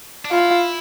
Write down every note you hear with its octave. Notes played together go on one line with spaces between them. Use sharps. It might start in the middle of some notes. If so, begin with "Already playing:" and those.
D4
E4 F4